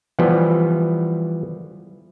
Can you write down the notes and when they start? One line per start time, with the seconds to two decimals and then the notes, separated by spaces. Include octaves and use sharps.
0.19 E3 F3 G3 B3